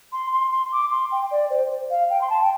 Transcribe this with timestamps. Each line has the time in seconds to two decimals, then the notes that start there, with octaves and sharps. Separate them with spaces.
0.13 C6
0.32 C6
0.52 C6
0.72 D6
0.91 C6
1.12 G5
1.31 D5
1.50 C5
1.90 F5
2.10 G5
2.21 C6
2.30 A5
2.42 G5